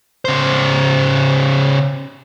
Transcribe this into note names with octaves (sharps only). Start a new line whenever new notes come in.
C#3 C5